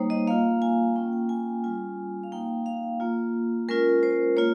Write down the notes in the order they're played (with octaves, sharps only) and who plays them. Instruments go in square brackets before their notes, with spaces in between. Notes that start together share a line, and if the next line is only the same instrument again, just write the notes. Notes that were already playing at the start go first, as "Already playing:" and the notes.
Already playing: [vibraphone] G3 A#3 D#4 C5 C#5
D#5
A#3 F4 F5
G#5
A#3 C#4 F4 G5
G5
G#5
G3 C#4 F4 G#5
F5
A#3 D#4 G5
F5
A#3 F4
G#3 C#4 F4 A#4
C5
A#3 F4 C#5